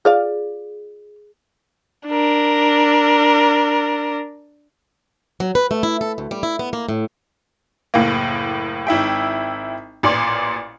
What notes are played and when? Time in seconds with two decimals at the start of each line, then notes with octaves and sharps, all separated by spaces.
0.05 F4 G#4 D5 F5
2.08 D4 A#4
5.40 F#3
5.55 B4
5.71 A3
5.83 E4
6.01 A4
6.18 D2
6.31 G3
6.43 E4
6.59 B3
6.73 A#3
6.89 A2
7.94 F#1 A2 A#3
8.87 G#1 E4 E5 G5
10.03 A1 A#2 D5 C6